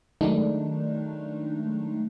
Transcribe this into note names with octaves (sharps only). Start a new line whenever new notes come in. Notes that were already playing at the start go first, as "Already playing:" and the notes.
D#3 F#3 G#3 A3 D4 D#4